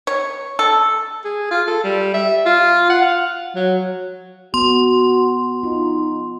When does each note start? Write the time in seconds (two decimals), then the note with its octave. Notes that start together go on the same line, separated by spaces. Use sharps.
0.07 C#5
0.59 A4
1.24 G#4
1.51 F4
1.67 A4
1.84 G3
2.14 E5
2.46 F4
2.90 F#5
3.02 F5
3.55 F#3
4.54 B3 F#4 C6
5.63 D#4 F4